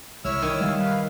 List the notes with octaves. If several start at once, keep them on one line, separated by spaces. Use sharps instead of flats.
C2 E4 C#5 E6 F6
D#3
G3 F5
B4